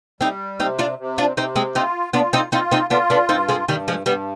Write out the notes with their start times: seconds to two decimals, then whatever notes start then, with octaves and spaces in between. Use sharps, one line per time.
0.21 G3 C4 D#4
0.60 C3 C4 D#4
0.79 D4 F4
0.99 C3
1.18 D4 F4
1.37 C3 C4 D#4
1.56 G#3 C4
1.75 C4 D#4 F4
2.13 B3 D4 F4
2.33 C4 D#4
2.52 C4 D#4 F4
2.72 C4 D#4
2.90 B3 D4 F4
3.10 B3 D4
3.29 G2 C4 D#4
3.49 G#3 C4
3.68 G2 D#3 G3
3.88 F3 G#3
4.06 G2 G3 B3